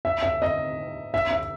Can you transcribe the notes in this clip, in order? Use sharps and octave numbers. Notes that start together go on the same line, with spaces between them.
E5
E5
D#5
E5
E5